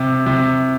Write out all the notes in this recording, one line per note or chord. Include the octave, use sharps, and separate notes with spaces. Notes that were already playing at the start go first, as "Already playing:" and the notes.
Already playing: C3
C3